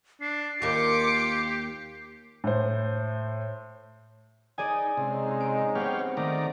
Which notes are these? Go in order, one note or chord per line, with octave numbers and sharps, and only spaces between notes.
D4 C7
D#2 A#3 F4 G4 D6 C#7
A2 C5
D#4 G#4 D5 G#5
C3 G#3 C#4 D#4
D7
B3 C4 G4 C#5 F5
D#3 A3 D5 A#5